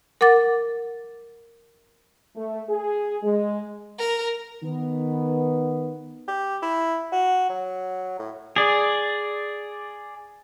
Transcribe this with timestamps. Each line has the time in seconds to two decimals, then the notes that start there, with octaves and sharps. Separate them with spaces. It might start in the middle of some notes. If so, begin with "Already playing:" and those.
0.21 A#4 F#5 D6 A6
2.35 A3
2.69 G#4
3.23 G#3
3.99 A#4
4.63 D#3 B3
6.28 G4
6.62 E4
7.12 F#4
7.49 F#3
8.19 A2
8.56 G#4 D5